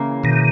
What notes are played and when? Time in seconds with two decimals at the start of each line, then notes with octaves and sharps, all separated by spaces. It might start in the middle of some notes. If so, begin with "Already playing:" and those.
Already playing: C#3 E3 A#3
0.24 B2 D#3